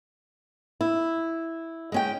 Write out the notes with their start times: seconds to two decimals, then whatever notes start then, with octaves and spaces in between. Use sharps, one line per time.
0.81 E4
1.92 G#3 C#4 G5